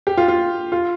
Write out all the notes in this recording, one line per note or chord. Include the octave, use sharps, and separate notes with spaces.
G4
F4
F4
F4